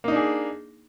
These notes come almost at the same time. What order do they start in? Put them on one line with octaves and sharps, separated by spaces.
A#3 D#4 D4 G#4